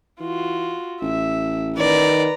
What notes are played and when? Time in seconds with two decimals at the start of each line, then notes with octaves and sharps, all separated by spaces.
0.20 E3 F4 F#4
1.01 A1 E5
1.77 D#3 B4 D5 A#5